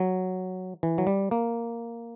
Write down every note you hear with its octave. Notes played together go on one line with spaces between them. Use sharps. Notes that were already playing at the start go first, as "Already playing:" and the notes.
Already playing: F#3
E3
F#3
G3
A#3